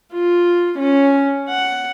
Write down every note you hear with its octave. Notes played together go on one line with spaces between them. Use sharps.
F4
C#4
F#5